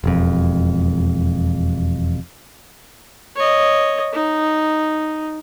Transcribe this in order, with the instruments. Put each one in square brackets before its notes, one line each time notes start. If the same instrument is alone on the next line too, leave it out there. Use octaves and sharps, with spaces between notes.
[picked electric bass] E1 F2
[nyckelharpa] C#5 D#5
D#4